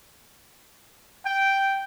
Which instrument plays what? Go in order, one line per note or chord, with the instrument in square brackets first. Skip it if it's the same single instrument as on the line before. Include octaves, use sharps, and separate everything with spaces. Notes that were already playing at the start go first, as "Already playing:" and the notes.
[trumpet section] G5